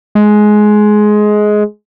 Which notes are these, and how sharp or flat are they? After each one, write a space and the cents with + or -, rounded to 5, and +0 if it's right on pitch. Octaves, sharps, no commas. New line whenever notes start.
G#3 +15